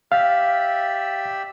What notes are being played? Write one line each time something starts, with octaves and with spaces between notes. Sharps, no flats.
G4 D5 E5 F5